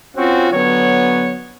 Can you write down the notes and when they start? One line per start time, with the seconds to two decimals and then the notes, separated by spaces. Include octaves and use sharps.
0.17 C4 C#4 F4 F#4
0.53 D3 F#3 B3 C#5